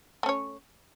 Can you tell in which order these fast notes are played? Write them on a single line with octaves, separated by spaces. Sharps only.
A3 C#4 C#5